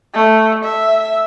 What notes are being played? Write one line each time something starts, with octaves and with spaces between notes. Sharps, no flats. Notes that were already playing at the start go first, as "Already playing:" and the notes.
A3
E5